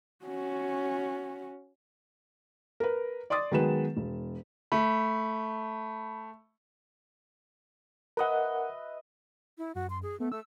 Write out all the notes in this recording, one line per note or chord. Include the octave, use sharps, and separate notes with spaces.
C#4 F#4
A#4 B4
D5 C6 D6 D#6 A6
D#3 F#3 G#3 B3 B4 E7
E1
A3 B5
A#4 B4 D#5 E5 F#5
E4
F#2 F#4
C6
G#4
A3 B3
A3 E6